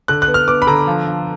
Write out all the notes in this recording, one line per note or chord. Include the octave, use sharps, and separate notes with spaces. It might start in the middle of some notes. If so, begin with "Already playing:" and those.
D3 F#6
F#6
B3
F6
B3 D6
B5
D3 A#5
F3
F3